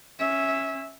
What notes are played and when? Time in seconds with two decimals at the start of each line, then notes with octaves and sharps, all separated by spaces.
0.20 C#4 E5